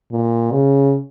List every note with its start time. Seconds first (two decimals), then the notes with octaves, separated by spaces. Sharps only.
0.12 A#2
0.52 C#3